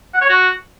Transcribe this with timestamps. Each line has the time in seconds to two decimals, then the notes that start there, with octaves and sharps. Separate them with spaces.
0.14 F#5
0.21 C#5
0.29 F#4